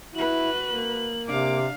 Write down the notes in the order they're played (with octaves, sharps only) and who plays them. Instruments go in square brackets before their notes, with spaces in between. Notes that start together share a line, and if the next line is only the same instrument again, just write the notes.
[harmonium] E4 [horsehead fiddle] F#4 B4 [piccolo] F#7
[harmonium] A#3
[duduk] C3 [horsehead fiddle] D4 F5 [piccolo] D6